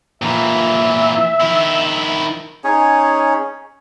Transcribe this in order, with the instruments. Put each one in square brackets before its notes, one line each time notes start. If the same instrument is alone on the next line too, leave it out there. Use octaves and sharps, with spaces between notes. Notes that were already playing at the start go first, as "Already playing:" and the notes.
[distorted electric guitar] A#2 E3 [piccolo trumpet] E5
[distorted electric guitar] D#3 E4
[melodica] C#4 D#4 G#4 C#5